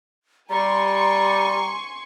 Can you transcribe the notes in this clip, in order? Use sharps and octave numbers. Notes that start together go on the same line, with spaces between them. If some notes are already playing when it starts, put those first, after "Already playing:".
G3 G#5 A#5 C6 C#6